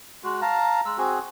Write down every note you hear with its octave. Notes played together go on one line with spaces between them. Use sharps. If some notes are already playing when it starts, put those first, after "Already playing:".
G#3 F#4
F5 A5 A#5
G#3 E6
C4 F#4 G#4